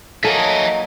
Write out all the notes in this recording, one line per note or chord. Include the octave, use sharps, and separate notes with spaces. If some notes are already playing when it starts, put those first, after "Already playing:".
F#3 A#3 D#4 A4 C#5 D#5 E5 G#5